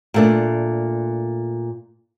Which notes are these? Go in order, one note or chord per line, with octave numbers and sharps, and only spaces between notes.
A#2 A3 D4